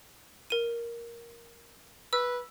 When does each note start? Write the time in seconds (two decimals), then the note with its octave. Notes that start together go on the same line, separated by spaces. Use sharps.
0.50 A#4 D#7
2.13 B4 E6